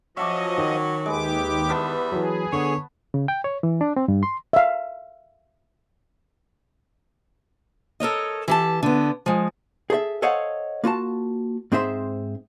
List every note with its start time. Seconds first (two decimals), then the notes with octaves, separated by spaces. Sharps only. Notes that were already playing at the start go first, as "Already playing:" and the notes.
0.17 F3 F#3 C#4 F#4 D#5 E5 A5 D6
0.58 D#3
1.06 D#2 G#3 G4 B4 D6
1.69 E2 G3 B3 B4 E5 A5
2.12 E3 F#3 G#4
2.53 D3 B3 C#5
3.14 C#3
3.28 G5
3.44 C#5
3.63 E3
3.81 D4
3.96 C4
4.08 G2
4.23 C6
4.53 E5 F5
8.00 A4 A#4 C#5 D#5
8.48 E3 G4 A5
8.83 D3 B3
9.26 F3 G#3
9.90 G#4 A4 C5 E5
10.22 A4 C5 C#5 D#5 F5 F#5
10.84 A#3 F4 F#4 A5
11.72 G#2 C4 G#4 C5 E5 C6